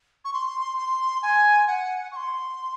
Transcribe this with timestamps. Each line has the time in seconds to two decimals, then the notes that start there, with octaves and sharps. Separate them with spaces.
0.25 C#6
0.33 C6
0.78 C6
1.22 G#5
1.67 F#5
2.12 C#6
2.16 C6